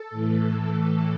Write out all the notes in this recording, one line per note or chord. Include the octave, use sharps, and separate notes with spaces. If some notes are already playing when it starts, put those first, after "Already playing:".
Already playing: A4
A2 E3